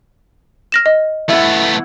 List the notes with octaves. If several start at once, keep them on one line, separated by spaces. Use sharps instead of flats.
F6 A#6 E7
D#5
A3 B3 E4 F#5